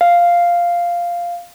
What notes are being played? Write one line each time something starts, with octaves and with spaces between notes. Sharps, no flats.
F5